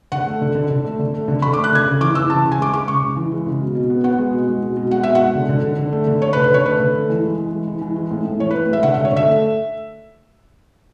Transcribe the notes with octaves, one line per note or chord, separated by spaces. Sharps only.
D3 F#5
A3
D3
D3
D3
A3
D3
A3
D3
D3 B5
A3 D6
F#6
D3 G#6
C#3
E3 D6
E3 E6
C#3 A5
C#3
G#5
G#3 D6
G#3 D6
C#3 C#6
C#3
E3
G#3
C#3
B2
B2
B3
B3 F#5
G#3
B2
G#3
B2
B2
G#3 F#5
B2 E5
F#5
G#3
D3
D3
D3
D3
A3
D3
A3 C#5
B4
D3
B4
D3 C#5
A3 B4
D3
A3
E3
G#3
E3
G#3
E3
E3
G#3
A2
A2
E3 C#5
A2 B4
G#3 E5
D3 F#5
D3 E5
C#5
D3 E5
A3